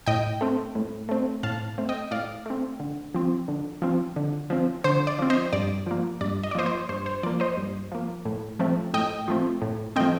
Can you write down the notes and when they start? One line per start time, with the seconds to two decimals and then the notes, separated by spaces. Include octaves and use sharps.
0.06 A2 D#5 G5
0.41 A3 C4
0.75 A2
1.09 A3 C4
1.43 A2 F5 A5
1.78 A3 C4
1.89 D#5 G5
2.11 A2 D5 F5
2.46 A3 C4
2.80 D3
3.15 F3 C4
3.48 D3
3.82 F3 C4
4.16 D3
4.50 F3 C4
4.84 D3 C5
5.07 D5
5.19 F3 C4
5.30 C5 D#5
5.53 G2 D5
5.86 F3 A#3
6.21 G2 D5
6.43 D#5
6.51 D5
6.55 F3 A#3 C5 D#5
6.66 C5
6.89 G2 C5
7.06 C5
7.23 F3 D5
7.26 A#3
7.40 C5 D#5
7.57 G2
7.92 F3 A#3
8.25 A2
8.59 F3 A3 C4
8.94 A2 D#5 G5
9.28 F3 A3 C4
9.62 A2
9.96 F3 A3 C4 D#5 G5